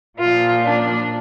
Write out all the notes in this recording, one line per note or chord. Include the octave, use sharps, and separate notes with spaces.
A#2 F3 F4
D4